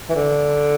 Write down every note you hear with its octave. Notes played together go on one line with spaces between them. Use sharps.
E3
D3